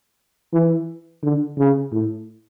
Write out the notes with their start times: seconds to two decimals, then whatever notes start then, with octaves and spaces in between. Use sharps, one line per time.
0.53 E3
1.23 D3
1.58 C#3
1.92 A2